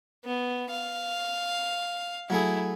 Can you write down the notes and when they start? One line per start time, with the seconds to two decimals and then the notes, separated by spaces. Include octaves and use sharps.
0.25 B3
0.70 F5
2.30 F#3 A3 E4 G#4